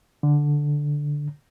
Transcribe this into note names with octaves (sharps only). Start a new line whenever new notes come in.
D3